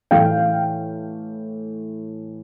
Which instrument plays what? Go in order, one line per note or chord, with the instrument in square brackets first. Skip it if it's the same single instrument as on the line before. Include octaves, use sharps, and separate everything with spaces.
[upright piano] A2 E3 A3 F5 G5